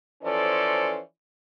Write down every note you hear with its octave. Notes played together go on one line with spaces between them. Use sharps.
E3 F3 C#4 A4 C5 D5